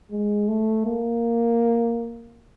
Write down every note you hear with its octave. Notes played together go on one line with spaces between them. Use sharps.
G#3
A3
A#3